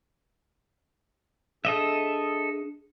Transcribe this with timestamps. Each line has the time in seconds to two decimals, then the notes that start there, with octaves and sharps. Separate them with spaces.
1.65 D4 G#4 A4 D#5 E5